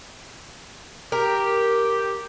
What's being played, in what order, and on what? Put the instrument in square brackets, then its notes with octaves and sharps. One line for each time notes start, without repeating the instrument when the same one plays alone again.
[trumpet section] G4 [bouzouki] A#4